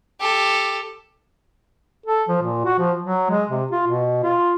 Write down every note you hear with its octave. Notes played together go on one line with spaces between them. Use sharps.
G4 A4
A4
F3
A#2
F#4
F3
F#3
G#3
C3
F4
B2
F4